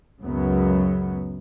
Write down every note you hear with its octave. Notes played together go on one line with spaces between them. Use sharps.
C#2 F#2 C#3 F#3 B3